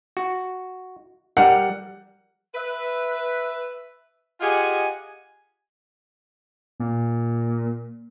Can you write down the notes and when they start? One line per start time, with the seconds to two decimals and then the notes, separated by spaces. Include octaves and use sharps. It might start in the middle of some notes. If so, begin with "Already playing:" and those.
0.17 F#4
1.37 G3 A#4 F#5
2.55 B4 E5
4.41 F4 G4 G#4 D#5 F#5 G#5
6.80 A#2